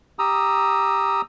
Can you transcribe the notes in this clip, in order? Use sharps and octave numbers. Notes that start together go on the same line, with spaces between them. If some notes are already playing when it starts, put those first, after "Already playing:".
G4 A#5 D#6 E6